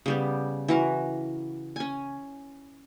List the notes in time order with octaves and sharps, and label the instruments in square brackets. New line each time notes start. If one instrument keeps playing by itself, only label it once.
[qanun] C#3 G3 B3
E3 F#4 A#4
C#4 G#5